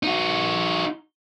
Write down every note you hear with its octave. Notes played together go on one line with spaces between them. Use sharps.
D#4 F#4